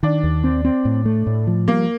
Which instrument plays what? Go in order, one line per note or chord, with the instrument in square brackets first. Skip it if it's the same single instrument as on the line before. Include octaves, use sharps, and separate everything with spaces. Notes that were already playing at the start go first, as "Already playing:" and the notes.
[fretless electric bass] D#3 [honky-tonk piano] D4
[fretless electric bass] D#2
C4
C4
A2
A3
A2
F3
[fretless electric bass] G3 [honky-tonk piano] A#3